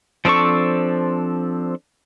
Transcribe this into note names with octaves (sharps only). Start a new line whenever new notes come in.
F3 C4 D4 A4 C#6